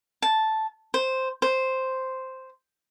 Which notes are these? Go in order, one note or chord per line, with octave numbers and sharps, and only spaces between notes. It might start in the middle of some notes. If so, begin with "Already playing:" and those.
A5
C5
C5